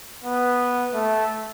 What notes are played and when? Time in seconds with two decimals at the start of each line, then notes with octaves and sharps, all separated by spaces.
0.24 B3
0.94 A3